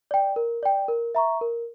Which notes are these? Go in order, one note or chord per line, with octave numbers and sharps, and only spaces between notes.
D5 G5
A#4
D5 G5
A#4
E5 A#5 C#6
A#4